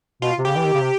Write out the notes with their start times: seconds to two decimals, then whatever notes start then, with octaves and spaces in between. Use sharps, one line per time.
0.22 B2 F4
0.39 C3
0.45 C#3 G4
0.56 E3
0.64 D#3
0.73 C#3
0.81 C3